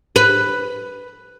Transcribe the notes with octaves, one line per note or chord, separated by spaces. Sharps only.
B4